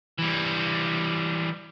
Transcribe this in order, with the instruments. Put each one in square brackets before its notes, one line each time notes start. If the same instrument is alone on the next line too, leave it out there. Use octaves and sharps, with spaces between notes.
[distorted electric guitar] E3 G3